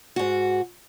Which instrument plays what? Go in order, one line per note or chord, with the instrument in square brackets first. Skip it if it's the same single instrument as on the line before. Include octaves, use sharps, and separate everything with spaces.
[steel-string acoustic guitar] G#2 F#4